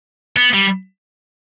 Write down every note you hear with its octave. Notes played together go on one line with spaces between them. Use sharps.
B3
G3